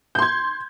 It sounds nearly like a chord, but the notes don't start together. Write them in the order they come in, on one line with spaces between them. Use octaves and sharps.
G6 C6 G#6